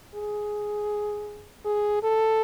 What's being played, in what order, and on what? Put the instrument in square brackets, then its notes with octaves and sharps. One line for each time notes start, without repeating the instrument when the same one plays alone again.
[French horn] G#4
G#4
A4